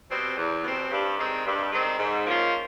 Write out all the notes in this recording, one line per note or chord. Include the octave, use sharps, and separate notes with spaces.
B2 G3 C4
E2
B2 G3 C4
G2
D#3 G#3 C4
G2
D#3 G#3 C4
G#2
F3 A#3 C#4 F4